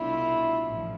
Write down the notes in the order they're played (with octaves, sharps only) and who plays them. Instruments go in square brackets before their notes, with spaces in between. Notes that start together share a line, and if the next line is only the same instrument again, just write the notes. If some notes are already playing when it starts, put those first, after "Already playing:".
Already playing: [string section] C2 B2 A3 D4 F4 [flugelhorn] E4
[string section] A1 A2 F3